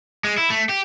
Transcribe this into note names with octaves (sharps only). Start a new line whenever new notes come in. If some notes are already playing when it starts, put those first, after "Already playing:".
G#3
E4
A3
G4